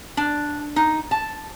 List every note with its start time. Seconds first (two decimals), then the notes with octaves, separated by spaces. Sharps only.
0.17 D4
0.76 D#4
1.11 A5